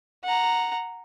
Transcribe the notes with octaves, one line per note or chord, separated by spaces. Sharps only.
F#5 A#5